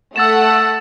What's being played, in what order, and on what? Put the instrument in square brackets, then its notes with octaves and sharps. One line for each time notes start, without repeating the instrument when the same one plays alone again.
[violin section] A3 F#5 [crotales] E6 A6 E7